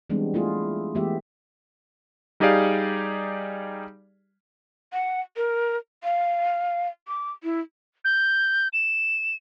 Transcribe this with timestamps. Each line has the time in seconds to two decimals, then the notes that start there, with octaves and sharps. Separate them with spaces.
0.10 E3 G3 G#3 B3 C4 D4
0.34 A3 E4 F4 G#4
0.95 E3 G#3 A3 B3 G4 E5
2.40 G3 D#4 G4 G#4 D5 F5
4.93 F#5
5.37 A#4
6.04 F5
7.08 D6
7.43 E4
8.05 G6
8.73 E7